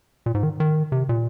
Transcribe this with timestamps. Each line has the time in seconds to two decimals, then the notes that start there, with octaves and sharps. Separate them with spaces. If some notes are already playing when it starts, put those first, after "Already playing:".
0.26 A#2
0.34 G#2
0.43 D#3
0.60 D#3
0.92 C3
1.09 A#2